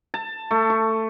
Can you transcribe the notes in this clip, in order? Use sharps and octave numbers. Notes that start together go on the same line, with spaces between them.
A5
A3
C#6